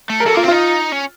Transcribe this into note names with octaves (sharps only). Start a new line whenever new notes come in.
A3
A#4
F#3 A4
A#3 F4
C4
D#4 F4
C#4